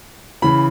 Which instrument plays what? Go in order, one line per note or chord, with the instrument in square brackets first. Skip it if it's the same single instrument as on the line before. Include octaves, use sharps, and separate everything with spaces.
[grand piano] C#3 E3 B5